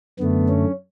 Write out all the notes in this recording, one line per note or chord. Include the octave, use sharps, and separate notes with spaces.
F#2 D3 A3 B3
C#4